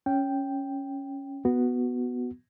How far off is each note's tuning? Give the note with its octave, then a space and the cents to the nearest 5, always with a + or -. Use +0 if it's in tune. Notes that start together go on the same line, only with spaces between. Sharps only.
C#4 +0 G5 +0
B3 +0 F#4 +0